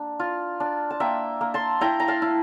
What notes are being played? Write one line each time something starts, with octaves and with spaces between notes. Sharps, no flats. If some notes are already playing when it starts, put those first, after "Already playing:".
Already playing: A#3 D4 A5
F4
D4
A5
A#3 E5 G5
A#3
A5 C6
E4 G5 A#5
A#5
F5 A5
E4